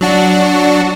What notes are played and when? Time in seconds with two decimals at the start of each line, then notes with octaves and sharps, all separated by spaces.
0.01 F#3 D4 F#4